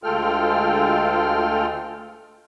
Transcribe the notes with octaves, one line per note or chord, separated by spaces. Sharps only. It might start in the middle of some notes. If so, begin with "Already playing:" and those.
D2 G#3 F4 A4 G5 F6